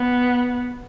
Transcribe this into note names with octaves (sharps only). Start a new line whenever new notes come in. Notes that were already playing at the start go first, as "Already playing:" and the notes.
Already playing: B3